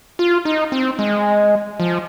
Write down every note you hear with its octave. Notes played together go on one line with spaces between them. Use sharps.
F4
D#4
C4
G#3
F3